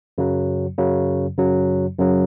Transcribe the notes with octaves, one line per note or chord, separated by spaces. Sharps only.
F#2 C#3 F#3
F#2 C#3 F#3
F#2 C#3 F#3
F#2 C#3 F#3